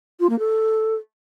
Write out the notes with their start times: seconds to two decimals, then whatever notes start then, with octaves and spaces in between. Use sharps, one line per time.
0.20 F4
0.29 A#3
0.39 A4